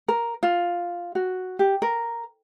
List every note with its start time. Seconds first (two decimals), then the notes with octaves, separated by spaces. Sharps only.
0.08 A#4
0.43 F4
1.15 F#4
1.59 G4
1.82 A#4